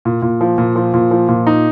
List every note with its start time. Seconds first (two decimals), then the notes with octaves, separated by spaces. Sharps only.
0.05 A#2
0.22 A#2
0.41 F3
0.58 A#2
0.76 F3
0.94 A#2
1.11 F3
1.28 A#2
1.47 D#4